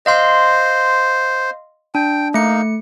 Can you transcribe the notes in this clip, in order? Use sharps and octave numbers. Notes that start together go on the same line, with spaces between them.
C5 D#5 F5 C6
D4 G5
A3 A#3 D#4 C#7